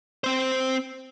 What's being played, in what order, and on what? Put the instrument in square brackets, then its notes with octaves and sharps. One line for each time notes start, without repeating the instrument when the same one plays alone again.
[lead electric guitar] C4 C5